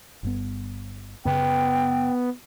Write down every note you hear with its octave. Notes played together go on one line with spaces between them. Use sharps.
G1 G2 B3
F#2 C#3 B3 G5